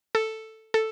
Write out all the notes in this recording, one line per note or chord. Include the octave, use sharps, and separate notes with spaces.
A4
A4